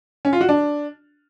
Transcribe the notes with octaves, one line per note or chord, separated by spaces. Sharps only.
C#4
F4
F#4
D4